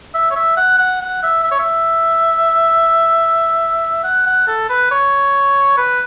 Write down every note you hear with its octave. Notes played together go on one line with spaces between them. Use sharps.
E5
C#5
E5
F#5
F#5
F#5
E5
E5
C#5
E5
F#5
F#5
A4
B4
C#5
B4